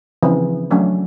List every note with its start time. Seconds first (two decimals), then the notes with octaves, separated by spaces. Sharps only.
0.23 C#3 E3 F3 C4 B4
0.71 F#3 A3 C#4 D4